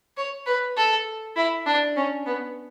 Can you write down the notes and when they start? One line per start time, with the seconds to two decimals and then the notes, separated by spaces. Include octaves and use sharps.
0.17 C#5
0.46 B4
0.77 A4
1.37 E4
1.66 D4
1.96 C#4
2.26 B3